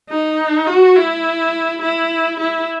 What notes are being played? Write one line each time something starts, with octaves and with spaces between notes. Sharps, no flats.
D#4
F#4
E4
E4
E4